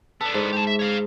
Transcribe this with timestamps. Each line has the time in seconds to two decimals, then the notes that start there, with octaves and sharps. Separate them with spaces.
0.21 B3 D4 A4
0.34 G#2
0.53 G4 A5
0.67 E5
0.79 C#5 F5